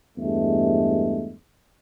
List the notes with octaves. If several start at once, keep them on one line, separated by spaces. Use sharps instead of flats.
E2 G2 G#3 A3